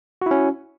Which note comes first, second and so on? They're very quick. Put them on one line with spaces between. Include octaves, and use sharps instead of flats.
F#4 E4 C#4